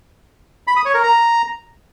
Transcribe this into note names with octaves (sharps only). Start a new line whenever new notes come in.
B5
D#6
C#5
A#4
A#5